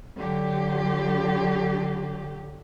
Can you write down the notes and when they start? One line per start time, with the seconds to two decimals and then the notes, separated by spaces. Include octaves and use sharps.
0.18 D3 F#3 G4